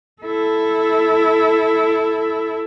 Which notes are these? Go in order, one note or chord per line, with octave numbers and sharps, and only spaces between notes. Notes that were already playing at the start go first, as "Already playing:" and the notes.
E4 A4